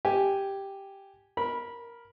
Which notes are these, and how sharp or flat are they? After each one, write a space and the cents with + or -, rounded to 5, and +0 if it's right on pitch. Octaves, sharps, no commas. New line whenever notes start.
G4 +0 G#5 +0
A#4 +5 B5 -15